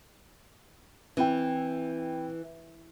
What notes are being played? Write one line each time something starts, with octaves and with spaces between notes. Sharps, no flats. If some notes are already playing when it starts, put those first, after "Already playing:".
E3 C4 E4 G5